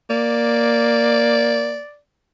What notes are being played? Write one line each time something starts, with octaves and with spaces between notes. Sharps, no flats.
A#3 D5